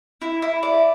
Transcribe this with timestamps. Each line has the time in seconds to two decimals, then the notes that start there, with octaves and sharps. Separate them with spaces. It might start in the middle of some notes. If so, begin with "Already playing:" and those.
0.22 E4
0.42 E4
0.63 D5